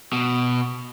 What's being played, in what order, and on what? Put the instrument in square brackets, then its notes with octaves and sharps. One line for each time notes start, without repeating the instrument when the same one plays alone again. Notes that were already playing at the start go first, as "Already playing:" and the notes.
[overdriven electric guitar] B2